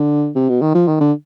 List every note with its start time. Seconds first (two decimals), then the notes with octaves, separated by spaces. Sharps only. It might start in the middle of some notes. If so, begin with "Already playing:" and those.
Already playing: D3
0.35 C3
0.49 B2
0.61 D#3
0.75 F3
0.88 D#3
1.00 D3